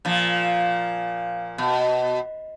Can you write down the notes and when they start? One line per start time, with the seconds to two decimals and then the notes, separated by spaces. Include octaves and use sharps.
0.05 A#2 F3
1.58 B2